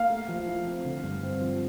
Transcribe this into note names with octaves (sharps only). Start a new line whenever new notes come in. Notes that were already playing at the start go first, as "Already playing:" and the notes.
Already playing: A#3 F5
A3
F3
E4
C4
D3
G2
C4
F3